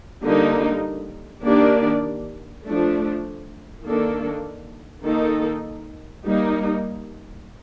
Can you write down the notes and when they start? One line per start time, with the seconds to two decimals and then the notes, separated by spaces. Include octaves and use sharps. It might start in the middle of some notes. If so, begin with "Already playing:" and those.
0.24 D3 G3 A#3 D#4
1.44 D#3 A#3 D4 G4 D5
2.64 F3 A3 D4
3.85 D#3 A#3 D4 A4
5.04 D#3 A#3 D#4 A4
6.24 G3 A#3 D#4